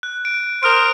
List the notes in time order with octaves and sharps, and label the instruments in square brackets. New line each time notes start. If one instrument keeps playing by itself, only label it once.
[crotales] F#6
D7
[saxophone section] A#4 C5 [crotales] D#6 F6 D7